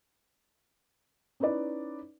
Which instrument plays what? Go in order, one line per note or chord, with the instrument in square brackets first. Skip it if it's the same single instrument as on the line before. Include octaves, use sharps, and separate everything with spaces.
[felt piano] C#4 D#4 E4 B4 D5